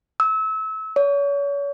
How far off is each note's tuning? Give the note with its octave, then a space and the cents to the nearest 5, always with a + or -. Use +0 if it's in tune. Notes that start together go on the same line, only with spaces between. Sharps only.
E6 -30
C#5 +35